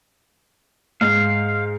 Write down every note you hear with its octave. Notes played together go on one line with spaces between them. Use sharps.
G#2 F5